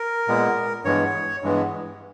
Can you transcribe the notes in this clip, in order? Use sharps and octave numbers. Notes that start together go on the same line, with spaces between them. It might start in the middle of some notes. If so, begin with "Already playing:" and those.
Already playing: A#4
A#2 G#3 B3
G2 E3 G#3 B3 C#5
G2 E3 G#3 B3